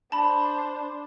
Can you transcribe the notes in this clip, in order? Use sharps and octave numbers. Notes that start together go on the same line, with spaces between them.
D4 C5 A5 B5